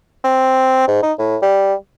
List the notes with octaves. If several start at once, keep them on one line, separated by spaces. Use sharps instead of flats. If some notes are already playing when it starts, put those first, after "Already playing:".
C4
G#2
D#4
A2
G3